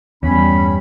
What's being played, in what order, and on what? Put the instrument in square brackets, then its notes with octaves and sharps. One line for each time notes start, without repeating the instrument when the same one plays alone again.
[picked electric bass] E2 [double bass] G2 G3 [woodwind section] C#4 B5